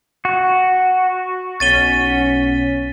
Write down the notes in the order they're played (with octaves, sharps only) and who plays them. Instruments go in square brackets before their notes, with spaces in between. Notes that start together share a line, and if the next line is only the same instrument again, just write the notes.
[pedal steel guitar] F#4
[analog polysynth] B1 C#4 B6 [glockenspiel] A6 D#7 G7